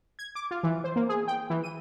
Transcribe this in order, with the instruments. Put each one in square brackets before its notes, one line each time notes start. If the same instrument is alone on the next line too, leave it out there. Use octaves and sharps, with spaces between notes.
[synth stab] G#6
D6
F4
E3
C5
A#3
G#4
G5
E3
D#7